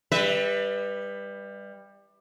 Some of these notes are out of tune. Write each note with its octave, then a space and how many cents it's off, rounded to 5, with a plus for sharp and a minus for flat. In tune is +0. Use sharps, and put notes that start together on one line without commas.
G3 +20 B4 +0 E5 -20